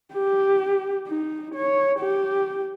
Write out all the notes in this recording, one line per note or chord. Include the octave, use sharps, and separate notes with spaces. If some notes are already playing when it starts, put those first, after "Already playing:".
G4
D#4
C#5
G4